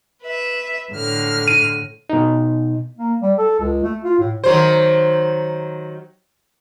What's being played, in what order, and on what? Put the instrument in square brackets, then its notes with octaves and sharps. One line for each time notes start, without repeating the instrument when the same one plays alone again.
[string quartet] B4 E5
A2 D3 F6
[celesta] D#7
[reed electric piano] B2 D#4
[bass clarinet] A#3
G3
A4
C#2
A3
F4
A2
[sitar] D#3 F#3 C5